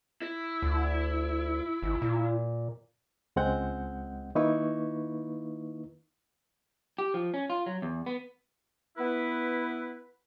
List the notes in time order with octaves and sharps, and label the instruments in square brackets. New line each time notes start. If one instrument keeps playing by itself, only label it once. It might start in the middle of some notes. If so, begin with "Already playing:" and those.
[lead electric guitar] E4
[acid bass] D2
G#1
A#2
[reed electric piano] C#2 G#3 C4 F#5 G6
D#3 A#3 D#4 E4 B4 C#6
[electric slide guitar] G4
F3
C#4
F4
F#3
E2
B3
[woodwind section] B3 E4 B4